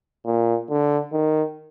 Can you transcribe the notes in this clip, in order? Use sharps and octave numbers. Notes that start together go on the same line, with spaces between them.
A#2
D3
D#3